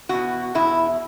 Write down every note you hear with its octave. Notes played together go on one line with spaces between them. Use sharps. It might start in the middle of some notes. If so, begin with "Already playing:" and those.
E2 B2 F#4
E2 B2 E4